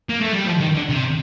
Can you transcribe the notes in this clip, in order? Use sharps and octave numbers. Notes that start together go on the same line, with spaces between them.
A#3
A3
G3
F3
D#3
D3
C3